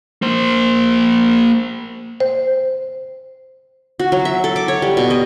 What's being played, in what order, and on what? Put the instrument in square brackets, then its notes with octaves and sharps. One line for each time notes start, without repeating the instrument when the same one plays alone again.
[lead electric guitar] A#3 C5
[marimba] C5
[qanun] F#4
F#3
E5
A4
D6
C#5
G3
B2
D#5